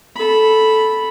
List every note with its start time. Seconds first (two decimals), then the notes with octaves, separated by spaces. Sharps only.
0.16 A4 B5